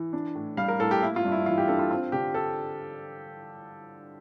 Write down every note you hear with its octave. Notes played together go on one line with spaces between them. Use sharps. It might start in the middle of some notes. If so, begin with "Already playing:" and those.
Already playing: E3
D4
A2
G3 F5
A#4
A2 A4
G4
A#3 E4
F4
G2
E4
E3 F4
G4
D4 A4
F4
C4 F4
D3 G4
A4